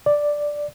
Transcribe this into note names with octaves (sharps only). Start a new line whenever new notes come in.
D5